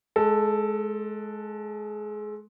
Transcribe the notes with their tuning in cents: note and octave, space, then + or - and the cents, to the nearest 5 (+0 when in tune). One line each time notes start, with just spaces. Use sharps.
G#3 +25 A4 +0